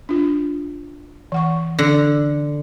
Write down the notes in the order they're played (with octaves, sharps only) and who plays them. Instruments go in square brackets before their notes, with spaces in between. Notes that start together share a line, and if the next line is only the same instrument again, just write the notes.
[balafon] D4 F4
E3 F#5 C#6
[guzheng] D3